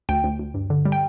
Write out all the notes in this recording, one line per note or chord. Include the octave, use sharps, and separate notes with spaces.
D2 G5
D2
D2
G2
D3
G3
G5